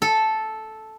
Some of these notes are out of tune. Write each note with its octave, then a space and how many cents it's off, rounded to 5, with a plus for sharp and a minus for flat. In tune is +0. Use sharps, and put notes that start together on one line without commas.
A4 -5